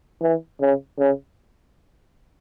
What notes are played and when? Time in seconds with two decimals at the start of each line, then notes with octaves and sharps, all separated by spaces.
0.22 E3
0.61 C#3
0.99 C#3